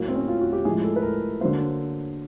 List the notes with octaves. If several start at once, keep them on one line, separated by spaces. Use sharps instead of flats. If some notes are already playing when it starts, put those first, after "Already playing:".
Already playing: A2 F#3 A#3
C4
C#4
F4
F#4
G4
A2 F3 G#3 G#4
A4
B4
A#4
D3 F#3 A#3 C5